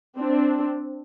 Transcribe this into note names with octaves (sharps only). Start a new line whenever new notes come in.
C4 D4